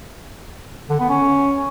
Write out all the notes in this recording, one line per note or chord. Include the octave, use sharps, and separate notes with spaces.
D3
B3
C#4